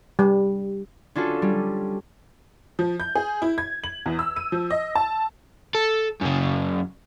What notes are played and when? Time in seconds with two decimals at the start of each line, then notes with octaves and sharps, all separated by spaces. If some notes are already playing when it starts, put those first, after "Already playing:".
0.19 G3
1.15 C#4 D4 F4 F#4 A4
1.42 G3 C#4
2.79 F3
3.00 G6
3.15 G#4
3.42 E4
3.58 G#6
3.84 F#7
4.06 E2
4.19 E6
4.36 D#7
4.52 F3
4.70 D#5
4.95 A5
5.75 A4
6.21 F#2 C#3